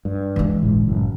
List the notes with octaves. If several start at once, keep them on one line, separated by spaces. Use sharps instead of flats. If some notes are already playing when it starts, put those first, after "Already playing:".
G2
E3 G#3
G1 C#2 A2
F#1 F#2 A2